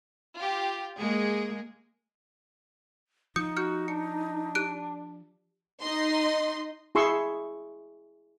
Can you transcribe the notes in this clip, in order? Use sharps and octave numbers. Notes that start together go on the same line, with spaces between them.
F4 G4
G#3 A#3 G#4
F3 D#4 D#6 G6 C#7
F#4 F6 G6 C#7
D4 C#7
G4 F#6 D7
D#4 D#5 C6
E4 G#4 C6 C#6 E6